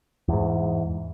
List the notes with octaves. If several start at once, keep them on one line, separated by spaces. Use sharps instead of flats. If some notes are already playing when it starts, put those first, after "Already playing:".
E2 G#2